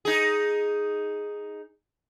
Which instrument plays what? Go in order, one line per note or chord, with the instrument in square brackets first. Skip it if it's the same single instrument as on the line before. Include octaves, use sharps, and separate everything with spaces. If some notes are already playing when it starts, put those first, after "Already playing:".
[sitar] D#4 G#4